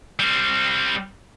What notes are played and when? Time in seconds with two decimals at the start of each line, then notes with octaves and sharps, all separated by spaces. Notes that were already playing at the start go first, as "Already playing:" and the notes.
0.19 G3 C4